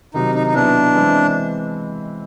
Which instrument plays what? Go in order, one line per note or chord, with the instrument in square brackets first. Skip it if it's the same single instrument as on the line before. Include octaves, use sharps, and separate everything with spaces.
[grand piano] C3 D#3 F#3 [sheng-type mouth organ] D#4
[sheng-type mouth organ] D#4
D#4
[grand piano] B2 F#3 B3 E4 [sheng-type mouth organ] D4
[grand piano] E3 G#3 C4 E4